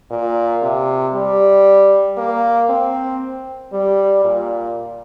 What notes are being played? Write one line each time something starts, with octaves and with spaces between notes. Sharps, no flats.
A#2
C3
G3
A#3
C4
G3
A#2